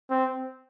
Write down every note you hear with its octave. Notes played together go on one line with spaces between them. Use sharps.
C4